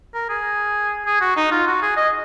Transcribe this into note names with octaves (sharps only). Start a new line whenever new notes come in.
A#4
G#4
G#4
F#4
D#4
F4
F#4
G#4
D#5